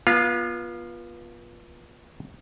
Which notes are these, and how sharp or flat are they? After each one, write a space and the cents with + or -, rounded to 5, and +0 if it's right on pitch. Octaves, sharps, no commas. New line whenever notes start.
B3 -35 F4 +0 F5 +0